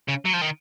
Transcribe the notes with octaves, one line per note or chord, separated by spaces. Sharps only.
C#3
F#3
F3
D#3